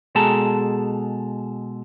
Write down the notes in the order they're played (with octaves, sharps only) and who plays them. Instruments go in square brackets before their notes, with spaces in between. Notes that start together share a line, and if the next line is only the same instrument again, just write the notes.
[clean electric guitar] B2 G#3 G#4 A4 A5 A#5